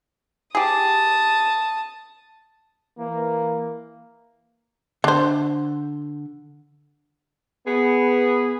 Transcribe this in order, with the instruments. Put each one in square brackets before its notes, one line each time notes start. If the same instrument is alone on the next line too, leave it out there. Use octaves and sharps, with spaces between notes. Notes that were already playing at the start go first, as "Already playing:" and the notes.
[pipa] G4 G#4 [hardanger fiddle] A5 D#6
[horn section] E3 A#3
[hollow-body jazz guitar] D3 [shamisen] D4 C5
[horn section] B3 G#4